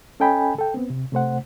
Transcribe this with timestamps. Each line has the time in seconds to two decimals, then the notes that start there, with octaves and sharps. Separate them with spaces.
0.20 C#4 A4 D#5 G5 G#5 B5
0.59 A4 G5
0.74 B3 C4
0.90 C3
1.12 C3 A3 C5 F#5